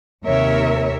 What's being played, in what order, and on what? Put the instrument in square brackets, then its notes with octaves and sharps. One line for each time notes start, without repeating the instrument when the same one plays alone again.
[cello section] D#2 C3 A#4 C#5 E5